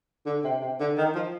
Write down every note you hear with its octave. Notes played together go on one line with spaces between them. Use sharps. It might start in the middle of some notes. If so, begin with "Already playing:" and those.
D3
C3
C3
D3
D#3
F3